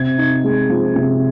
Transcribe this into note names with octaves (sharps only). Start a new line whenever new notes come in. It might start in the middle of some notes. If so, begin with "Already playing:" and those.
Already playing: C3 G#6
D#4
G#3
F3
C3